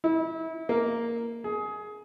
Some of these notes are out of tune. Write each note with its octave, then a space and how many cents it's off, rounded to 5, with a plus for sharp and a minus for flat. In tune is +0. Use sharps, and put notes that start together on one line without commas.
E4 -30
A#3 -5
G#4 +20